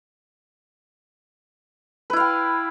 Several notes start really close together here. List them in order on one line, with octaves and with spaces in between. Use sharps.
B4 E4 F5 G5